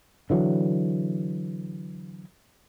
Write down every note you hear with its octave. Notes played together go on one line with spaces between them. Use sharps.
D3 E3 F#3